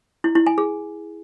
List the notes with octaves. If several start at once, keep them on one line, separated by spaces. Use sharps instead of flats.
E4
E4
G#5
G#4